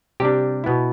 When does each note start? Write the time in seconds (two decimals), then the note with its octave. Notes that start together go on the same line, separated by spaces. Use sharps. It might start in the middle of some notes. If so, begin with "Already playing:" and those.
0.20 C3 G3 D4 G4
0.64 B2 B3 E4